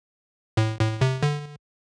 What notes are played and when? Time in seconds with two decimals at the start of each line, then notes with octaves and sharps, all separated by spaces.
0.57 A2
0.80 A2
1.01 C3
1.23 D3